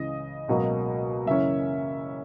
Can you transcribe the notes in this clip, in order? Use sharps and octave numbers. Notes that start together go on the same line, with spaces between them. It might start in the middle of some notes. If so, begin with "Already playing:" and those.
Already playing: C#2 C#3 E3 D#5
C#2 B2 F#3 A#3
F#2 C#3 E3 A#3 C#4 E5